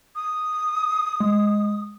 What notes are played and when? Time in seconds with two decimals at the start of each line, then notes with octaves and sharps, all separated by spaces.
0.15 D#6
1.20 G#3